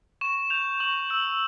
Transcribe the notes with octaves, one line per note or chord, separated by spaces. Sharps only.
C#6 E7
G6 F7
C#6 F#7
E6 F#7